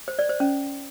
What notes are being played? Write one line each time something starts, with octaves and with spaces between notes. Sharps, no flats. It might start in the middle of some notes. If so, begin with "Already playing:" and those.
C5
D5
C5
C#4